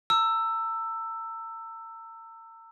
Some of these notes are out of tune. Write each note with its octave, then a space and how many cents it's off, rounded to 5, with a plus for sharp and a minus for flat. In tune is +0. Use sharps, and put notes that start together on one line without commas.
A#5 -40 E6 +10